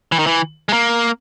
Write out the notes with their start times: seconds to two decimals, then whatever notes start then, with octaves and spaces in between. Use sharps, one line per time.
0.12 E3
0.19 D#3
0.26 E3
0.69 G#3
0.73 A#3